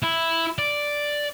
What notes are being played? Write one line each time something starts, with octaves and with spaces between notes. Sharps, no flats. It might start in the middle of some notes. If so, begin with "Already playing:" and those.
E4
D5